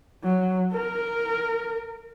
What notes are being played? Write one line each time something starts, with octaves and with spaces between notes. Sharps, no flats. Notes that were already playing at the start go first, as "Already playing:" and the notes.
F#3
A#4